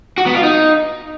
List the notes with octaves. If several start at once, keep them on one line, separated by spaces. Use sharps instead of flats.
F#4
B3
F4
D#4